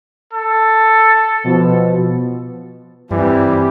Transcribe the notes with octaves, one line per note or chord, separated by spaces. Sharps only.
A4
B2 F3
G2 E3 G3 C4 G4